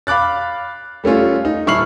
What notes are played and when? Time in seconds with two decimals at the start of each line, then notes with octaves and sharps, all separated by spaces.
0.07 F5 B5 D6 F#6 A6
1.04 G3 A3 C#4 F4
1.45 D#4
1.67 D#1 E4 C#6 F6 C7 F#7